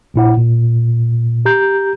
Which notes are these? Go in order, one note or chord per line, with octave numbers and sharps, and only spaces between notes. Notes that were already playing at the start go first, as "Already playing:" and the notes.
A#1 A#2 E4 F#5
A#2
G4 A#5 G6